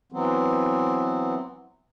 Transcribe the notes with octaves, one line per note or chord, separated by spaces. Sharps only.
E3 F#3 B3 C4